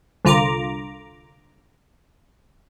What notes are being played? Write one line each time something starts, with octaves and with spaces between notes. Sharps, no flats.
C2 D3 F4 A#5 D6